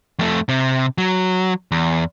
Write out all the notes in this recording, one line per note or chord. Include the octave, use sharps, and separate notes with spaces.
F2 A3
C3
F#3
E2